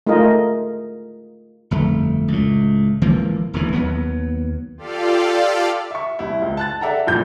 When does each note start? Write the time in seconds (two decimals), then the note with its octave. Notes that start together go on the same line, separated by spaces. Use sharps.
0.07 A3 D#4 F4 G#4 A#4 D#5
1.71 G1 F2 A3
2.28 C#2 A2
3.02 G#1 E3 F3 A#3
3.54 E1 D#2 E3
3.73 D#2 F#3 B3
4.77 F4 G4 A4 D5 F5
5.91 E5 C#6
6.19 C2 E4
6.42 C#2
6.57 A5 F#6 A6
6.81 A4 D5 E5 F#5 G5 A#5
7.07 C2 F2 A#2 G6